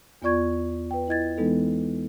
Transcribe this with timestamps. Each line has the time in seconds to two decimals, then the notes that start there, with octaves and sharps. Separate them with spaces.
0.22 E2 B3 F4 D5 C#6 G#6
0.91 B4 G5
1.08 E4 D#5 G#6 A6
1.37 E3 G#3 B3 D#4 A4